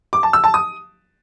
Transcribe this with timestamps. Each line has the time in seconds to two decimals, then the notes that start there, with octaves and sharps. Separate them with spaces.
0.13 D6
0.23 A5
0.33 E6
0.44 A5
0.54 D#6